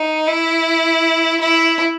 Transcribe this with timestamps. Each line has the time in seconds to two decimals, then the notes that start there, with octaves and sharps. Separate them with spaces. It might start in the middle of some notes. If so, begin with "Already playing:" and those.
Already playing: D#4
0.27 E4
1.41 E4